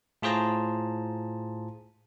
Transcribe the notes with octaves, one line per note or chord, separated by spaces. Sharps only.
A2 F4 G#4 C5 A5 A#5